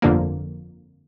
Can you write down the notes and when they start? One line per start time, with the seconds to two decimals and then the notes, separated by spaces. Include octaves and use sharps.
0.02 G1 F2 D3 F3 A#3